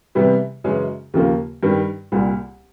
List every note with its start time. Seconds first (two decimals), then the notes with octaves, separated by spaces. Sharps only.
0.15 C3 E3 G3 B3
0.64 F#2 C#3 E3 G#3 C#4
1.14 D#2 C#3 F3 A#3
1.63 G2 D#3 G3
2.12 C2 A#2 G3